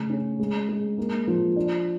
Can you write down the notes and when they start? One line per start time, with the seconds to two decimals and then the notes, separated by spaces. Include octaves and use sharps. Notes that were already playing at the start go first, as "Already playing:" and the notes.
Already playing: C#3 A3
0.10 C#4
0.39 G#3
0.69 G#3
0.98 A#3
1.27 F3
1.56 D4